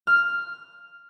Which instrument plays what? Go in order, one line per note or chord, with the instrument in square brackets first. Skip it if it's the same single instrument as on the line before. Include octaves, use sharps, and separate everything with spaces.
[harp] F6